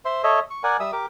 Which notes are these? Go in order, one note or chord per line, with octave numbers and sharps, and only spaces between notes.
C5 E5 C6
A4 C#5 D#5 E5
C#6
A#4 D5 F#5 G#5
G3 E5 D#6 E6
G4 A#4 D6